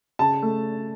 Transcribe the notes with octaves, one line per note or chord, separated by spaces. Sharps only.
C#3 A5
A3